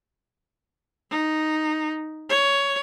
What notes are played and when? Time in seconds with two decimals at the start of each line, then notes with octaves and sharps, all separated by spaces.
1.11 D#4
2.30 C#5